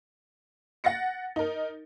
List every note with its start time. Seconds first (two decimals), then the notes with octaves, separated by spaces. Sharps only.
0.84 F#5 A6 A#6 C#7
1.36 D#4 A#4